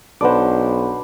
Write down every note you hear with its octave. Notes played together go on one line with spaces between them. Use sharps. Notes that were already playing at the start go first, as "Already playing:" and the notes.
B1 D4 B4 C5 F#5 D6